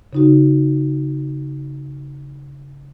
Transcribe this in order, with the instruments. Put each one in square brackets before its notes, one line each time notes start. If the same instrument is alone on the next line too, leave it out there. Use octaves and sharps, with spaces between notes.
[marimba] C#3 D#4 F#4